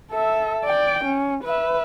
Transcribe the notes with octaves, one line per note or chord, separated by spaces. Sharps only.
A4 E5
D5 G5
C#4
B4 E5